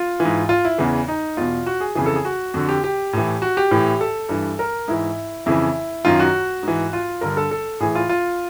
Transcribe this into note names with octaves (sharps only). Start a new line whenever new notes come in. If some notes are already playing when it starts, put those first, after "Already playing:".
Already playing: F4
E3
G#2
F4
E4
E2 C#3 E3
D#4
E2 B2 F4
F#4
G#4
F2 C#3 E3 G#4
A4
G#4
F#4
F2 D3 F#4
G4
G4
A2 E3
F#4
G4
A2 E3
A4
G2 E3
A#4
G#2 E3 E4
F2 C#3 E3 E4
F#2 D#3 F4
F#4
G#2 E3
F4
G2 D3 A#4
A4
A4
A2 E3 G#4
F4
F4